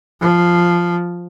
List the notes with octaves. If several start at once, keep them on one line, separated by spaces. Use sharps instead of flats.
F3